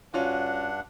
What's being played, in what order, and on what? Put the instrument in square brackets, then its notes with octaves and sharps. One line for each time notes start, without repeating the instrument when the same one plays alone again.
[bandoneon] G2 D4 F#5 [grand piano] C#4 F4 F#4